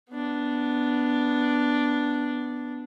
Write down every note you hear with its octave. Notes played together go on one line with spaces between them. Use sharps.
B3 D4